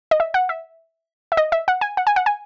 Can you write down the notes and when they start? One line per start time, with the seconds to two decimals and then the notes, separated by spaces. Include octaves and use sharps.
0.11 D#5
0.20 E5
0.34 F#5
0.49 E5
1.32 E5
1.37 D#5
1.52 E5
1.68 F#5
1.81 G#5
1.97 F#5
2.07 G#5
2.16 F#5
2.26 G#5